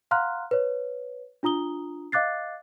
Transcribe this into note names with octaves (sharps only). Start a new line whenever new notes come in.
F5 F#5 A#5 C6 F6 F#6
B4 C#5
D4 F4 A#5 D#6 G7
D#5 F5 D6 F#6 A6 C7